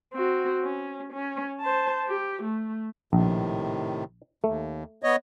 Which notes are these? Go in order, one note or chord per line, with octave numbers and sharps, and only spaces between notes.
C4 F#4
C#4
C#4
C5 A5
G4
A3
A#1 A2 C3 D#3
D#2 A3
B3 C#5 D#5